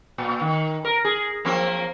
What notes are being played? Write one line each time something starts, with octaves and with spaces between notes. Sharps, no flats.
A#2
D#3
A#4
G#4
F3 A#3 C4